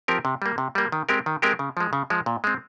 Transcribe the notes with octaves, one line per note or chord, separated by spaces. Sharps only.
F3 C4 G4 A#4
C3
G3 A#3
C3
G3 A#3
D#3
G#3 C4 G4 A#4
D#3
G#3 C4 G4 A#4
C#3
F3 G#3
C#3
F3 G#3
A#2
G#3 C4